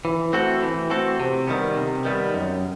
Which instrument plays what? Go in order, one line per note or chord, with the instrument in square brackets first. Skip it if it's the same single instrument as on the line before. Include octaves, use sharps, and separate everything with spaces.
[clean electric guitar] E3
A3 C4 F#4 A4
E3
A3 C4 F#4 A4
C3
D#3 G3 B3
C3
D#3 G3 B3
F#2